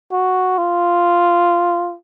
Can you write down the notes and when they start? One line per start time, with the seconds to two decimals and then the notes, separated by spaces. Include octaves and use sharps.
0.12 F#4
0.58 F4